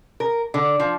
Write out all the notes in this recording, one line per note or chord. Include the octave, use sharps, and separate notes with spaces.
A#4
D3
F3